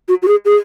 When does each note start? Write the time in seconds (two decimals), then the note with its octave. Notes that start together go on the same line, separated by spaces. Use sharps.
0.08 F#4
0.22 F#4
0.28 G#4
0.45 G#4